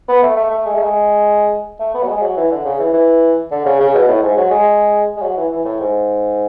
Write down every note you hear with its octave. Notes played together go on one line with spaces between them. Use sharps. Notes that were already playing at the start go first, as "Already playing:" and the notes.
B3
A3
A3
A3
G#3
A3
G#3
A3
B3
F#3
G#3
F#3
E3
D3
C#3
E3
E3
D3
C#3
C#3
B2
A2
G#2
F#3
G#3
G#3
F#3
E3
E3
A2
G#2